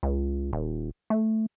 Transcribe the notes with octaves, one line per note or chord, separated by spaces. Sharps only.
C#2
D#1
A3